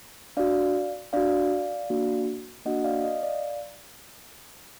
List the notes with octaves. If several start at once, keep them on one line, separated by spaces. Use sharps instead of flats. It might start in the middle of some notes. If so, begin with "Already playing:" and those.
D4 F#4 D5 F5
D4 F#4 D5 F5
A#3 D4 F#4
A#3 D4 F#4 D#5 F#5
D5 F5
D#5
D5 F5